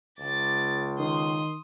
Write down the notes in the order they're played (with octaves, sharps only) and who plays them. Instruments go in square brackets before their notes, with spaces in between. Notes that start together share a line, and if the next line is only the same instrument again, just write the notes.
[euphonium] C#2 [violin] D6 A6
[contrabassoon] D#3 [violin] C6 D#6